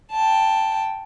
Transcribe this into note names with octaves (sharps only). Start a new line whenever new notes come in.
G5 A5